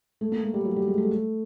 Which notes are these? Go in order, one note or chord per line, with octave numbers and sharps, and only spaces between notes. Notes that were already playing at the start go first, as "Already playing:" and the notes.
A3
A#3
A3
G3
F#3
G3
G#3
A3